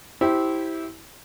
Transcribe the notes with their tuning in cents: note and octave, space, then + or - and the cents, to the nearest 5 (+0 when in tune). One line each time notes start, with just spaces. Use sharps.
E4 -15 G4 -15 C5 +0